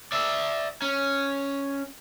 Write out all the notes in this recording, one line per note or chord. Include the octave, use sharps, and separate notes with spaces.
D5 E5
C#4